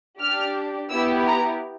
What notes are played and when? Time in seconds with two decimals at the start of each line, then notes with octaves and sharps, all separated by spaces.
0.20 D4 G4 F6
0.90 B3 E4 G4 E6
1.26 A#5